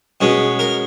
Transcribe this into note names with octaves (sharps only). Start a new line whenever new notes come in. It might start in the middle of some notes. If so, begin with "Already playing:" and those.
B2 G#3 C#4
A#4